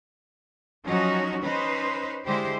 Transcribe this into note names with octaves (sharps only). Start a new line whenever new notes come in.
F3 F#3 C#4 D#4 F#4
C#4 D#4 B4 C5
D3 G#3 E4 G4 C5